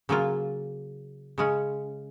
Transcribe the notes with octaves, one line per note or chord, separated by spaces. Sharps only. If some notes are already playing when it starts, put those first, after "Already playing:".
C#3 F#3 A#3 F4
C#3 G#3 C#4